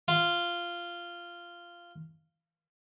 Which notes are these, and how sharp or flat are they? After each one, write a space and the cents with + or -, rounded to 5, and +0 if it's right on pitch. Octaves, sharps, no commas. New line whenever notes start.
F4 -10